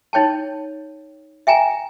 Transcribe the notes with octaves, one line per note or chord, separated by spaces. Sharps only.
D#4 C#5 G5 A5
E5 G5 G#5 A#5